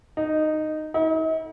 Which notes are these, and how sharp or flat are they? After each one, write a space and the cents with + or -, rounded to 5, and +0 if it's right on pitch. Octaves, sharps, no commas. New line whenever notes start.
D#4 -10
D#4 +45